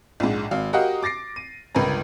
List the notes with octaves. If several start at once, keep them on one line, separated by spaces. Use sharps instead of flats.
A#1 G#2
G#1 F5
F#4 G4 A#4 D#5 F5 F#5
D6 A6 A#6 C7 D7
D#7
G1 C#2 A#4 B4 A#5